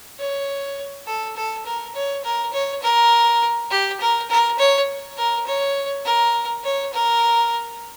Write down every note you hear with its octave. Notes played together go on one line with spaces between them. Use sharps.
C#5
A4
A4
A#4
C#5
A#4
C#5
A#4
G4
A#4
A#4
C#5
A#4
C#5
A#4
C#5
A#4